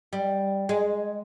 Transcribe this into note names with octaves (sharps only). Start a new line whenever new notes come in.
G3
G#3